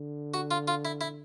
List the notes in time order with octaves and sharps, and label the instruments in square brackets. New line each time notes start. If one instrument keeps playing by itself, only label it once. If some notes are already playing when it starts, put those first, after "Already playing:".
Already playing: [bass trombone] D3
[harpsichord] F#4
F4
F4
E4
E4